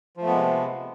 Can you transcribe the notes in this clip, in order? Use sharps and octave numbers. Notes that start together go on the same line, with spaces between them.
C3 F3 G#3 A3 B3